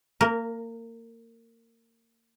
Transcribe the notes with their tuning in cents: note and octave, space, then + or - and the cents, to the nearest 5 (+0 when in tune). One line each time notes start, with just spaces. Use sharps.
A#3 -25 A#4 +0